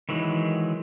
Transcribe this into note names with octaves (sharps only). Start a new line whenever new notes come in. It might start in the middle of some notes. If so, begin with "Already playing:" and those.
D#3 E3 F#3 G#3